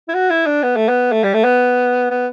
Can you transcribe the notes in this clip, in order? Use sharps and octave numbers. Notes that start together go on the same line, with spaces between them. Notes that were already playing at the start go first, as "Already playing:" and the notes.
E4
F#4
E4
D4
B3
A3
B3
A3
G3
A3
B3
B3